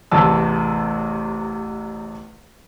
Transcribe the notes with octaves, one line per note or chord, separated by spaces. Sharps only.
A1 E2 C3 A5 E6